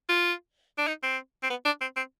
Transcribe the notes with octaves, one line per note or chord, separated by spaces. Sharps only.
F4
D4
D#4
C4
C4
B3
D4
C4
C4